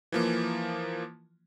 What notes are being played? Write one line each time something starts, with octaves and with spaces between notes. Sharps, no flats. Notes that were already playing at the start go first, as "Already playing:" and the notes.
E3 F3 A#3